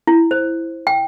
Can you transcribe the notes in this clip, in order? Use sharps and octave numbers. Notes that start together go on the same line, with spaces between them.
E4
C5
G5